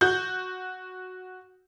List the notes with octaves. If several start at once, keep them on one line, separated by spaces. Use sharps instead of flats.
F#4 G6